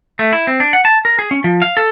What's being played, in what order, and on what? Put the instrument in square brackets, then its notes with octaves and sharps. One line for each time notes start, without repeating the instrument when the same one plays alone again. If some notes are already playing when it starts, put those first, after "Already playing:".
[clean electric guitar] A3
E4
C4
D4
F#5
A5
A#4
G#4
C#4
F3
F5
A4